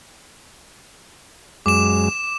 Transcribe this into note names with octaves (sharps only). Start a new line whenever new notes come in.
F#2 G#3 D6 E7